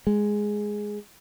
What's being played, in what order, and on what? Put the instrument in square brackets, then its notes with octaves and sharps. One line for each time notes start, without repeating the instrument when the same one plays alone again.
[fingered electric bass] G#3